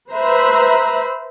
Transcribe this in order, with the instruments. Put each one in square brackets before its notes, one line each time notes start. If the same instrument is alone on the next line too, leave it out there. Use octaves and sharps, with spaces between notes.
[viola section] B4 C5 E5 A#5 B5